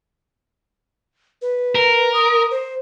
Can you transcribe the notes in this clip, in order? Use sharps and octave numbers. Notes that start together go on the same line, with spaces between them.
B4
A#4
D#6
C5